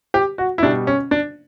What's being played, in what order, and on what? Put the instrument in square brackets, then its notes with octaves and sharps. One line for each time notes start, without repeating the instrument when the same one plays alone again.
[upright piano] G4
F#4
E4
B2 G3 D4
C#4
D4